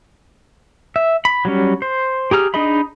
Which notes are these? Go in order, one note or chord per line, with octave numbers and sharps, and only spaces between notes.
E5
B5
F#3 G3 C#4
C5
G4 G#4 A#5 F6
D4 D#4 G#4 D#5 B5